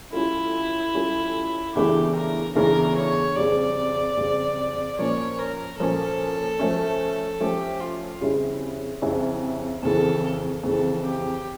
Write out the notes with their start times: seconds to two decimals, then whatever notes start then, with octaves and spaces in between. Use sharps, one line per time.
0.12 G3 C#4 E4 F4 A4
0.94 G3 C#4 F4 A4
1.74 E2 C#3 E3 A3 D4 G4
2.15 A#4
2.55 E2 C#3 E3 A3 D4 A#4
2.96 C#5
3.36 F2 C#3 G3 D5
4.17 F2 C#3 G3
4.98 A#2 F3 A#3 C#4 C#5
5.39 A#4
5.78 A#2 F3 A#3 C#4 A4
6.59 F3 A3 C#4
7.40 F3 A3 C#4 G4
7.80 F4
8.21 F2 C#3 G3 C#4 E4
9.02 F2 C#3 G3 C#4 E4
9.82 F2 C#3 E3 A4
10.63 F2 C#3 E3 A4
11.03 G4